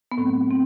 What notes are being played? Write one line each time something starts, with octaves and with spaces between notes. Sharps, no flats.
B3
A2 F#3 A3 C4
C4